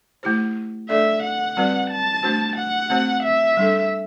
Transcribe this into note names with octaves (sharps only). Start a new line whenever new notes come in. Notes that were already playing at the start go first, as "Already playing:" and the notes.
A3 E4 G4 C5
A3 D4 A4 D5 E5
F#5
G3 C4 F#4 B4 D5
A5
A3 D4 F#4 C5
F#5
A3 C4 F#4 C5
E5
G3 D4 A4